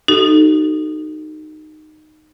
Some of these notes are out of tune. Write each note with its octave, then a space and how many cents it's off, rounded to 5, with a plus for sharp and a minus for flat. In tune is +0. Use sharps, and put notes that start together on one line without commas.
D#4 -15 F#4 +45 A4 +0